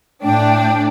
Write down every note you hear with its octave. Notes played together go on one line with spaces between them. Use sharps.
A2 D4 G5